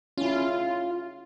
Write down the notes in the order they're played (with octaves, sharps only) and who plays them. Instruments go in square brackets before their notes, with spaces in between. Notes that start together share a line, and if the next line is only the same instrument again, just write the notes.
[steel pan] C#4 E4 [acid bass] F4